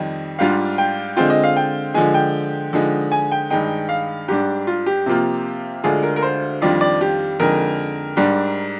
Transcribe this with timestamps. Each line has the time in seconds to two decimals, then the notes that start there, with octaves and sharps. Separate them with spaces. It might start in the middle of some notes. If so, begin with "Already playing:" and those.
Already playing: F2 D#3 G3 D#5
0.39 G#2 G3 D4 F4 F5
0.78 G5
1.16 D3 G#3 C4 F4 G5
1.30 D#5
1.44 F5
1.57 G5
1.94 D3 F3 G#3 G#5
2.14 G5
2.73 D3 F3 G#3 D#4
3.12 G#5
3.32 G5
3.50 G2 D#3 G#3 D#4 G5
3.89 F5
4.28 G#2 G3 D4 G4
4.67 F4
4.86 G4
5.06 C3 F3 A#3 F4
5.84 D2 D3 G#3 D4 F4 G#4
6.03 A#4
6.16 A#4
6.22 C5
6.62 F2 D#3 G3 D4 F4 D5
6.81 D5
7.01 G4
7.40 F2 D3 G#3 D#4 A#4
8.17 G#2 G3 D4